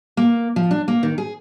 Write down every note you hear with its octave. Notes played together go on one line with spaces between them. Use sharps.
A#3
F3
D4
A#3
D#3
G#4